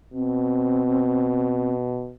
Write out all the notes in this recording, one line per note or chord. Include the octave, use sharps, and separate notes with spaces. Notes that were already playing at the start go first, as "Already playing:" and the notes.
B2 C4